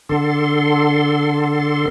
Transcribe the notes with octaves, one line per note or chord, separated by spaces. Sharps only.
D3 A4 C6